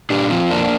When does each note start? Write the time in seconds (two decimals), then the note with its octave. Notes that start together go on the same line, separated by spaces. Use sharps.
0.10 A#2 D4 G4
0.30 F3 C4 F4
0.50 F2 A#3 D4